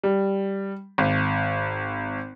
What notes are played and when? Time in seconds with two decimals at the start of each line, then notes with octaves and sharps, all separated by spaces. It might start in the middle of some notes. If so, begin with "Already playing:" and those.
0.03 G3
0.98 G#1